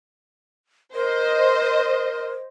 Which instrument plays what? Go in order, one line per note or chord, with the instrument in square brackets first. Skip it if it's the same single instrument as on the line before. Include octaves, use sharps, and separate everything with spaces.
[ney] A#4 [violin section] C5 D#5